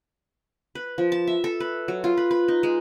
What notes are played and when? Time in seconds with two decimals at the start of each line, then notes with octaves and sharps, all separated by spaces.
0.75 B4
0.98 F3
1.12 A5
1.27 E5
1.44 A4
1.60 B4
1.88 F#3
2.04 F4
2.17 B4
2.31 B4
2.48 D#4
2.63 G#3